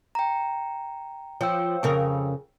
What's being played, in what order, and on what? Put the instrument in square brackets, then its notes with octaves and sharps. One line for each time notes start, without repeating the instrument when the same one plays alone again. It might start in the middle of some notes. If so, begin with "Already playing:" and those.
[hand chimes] G5 A#5
[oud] F3 [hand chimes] C#5 G5 E6
[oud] F2 C#3 A#4